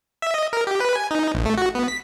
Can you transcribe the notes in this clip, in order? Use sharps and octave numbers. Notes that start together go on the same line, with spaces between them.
E5
D#5
A#4
G4
B4
G#5
D#4
A#1
A3
F#4
B3
B6